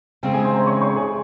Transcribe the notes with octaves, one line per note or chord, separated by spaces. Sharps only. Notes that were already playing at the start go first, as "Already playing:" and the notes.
C#3 G#3 C4 G5
G#4 G#5
C5 C6
A#5
C5 C6
C#5 C#6
C#5 C#6
G#4 G#5